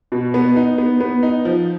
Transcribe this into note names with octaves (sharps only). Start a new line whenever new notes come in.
B2
B3
D#4
B3
B3
D#4
F3